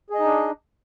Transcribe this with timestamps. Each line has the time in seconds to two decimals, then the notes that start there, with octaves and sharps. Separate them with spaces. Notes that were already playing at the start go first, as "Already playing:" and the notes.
0.10 G#4
0.15 D#5
0.20 D#4
0.25 D4